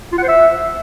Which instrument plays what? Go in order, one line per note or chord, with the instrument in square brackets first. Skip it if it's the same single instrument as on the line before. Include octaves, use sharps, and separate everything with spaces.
[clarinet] F4
F#5
C5
E5